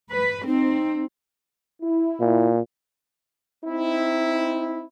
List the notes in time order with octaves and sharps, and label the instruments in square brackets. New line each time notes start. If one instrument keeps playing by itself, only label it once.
[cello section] B4
[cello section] C4 [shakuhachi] D#4
[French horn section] E4
[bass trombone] A#2
[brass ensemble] C4 D#4 E4